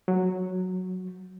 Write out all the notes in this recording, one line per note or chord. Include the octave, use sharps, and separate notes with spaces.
F#3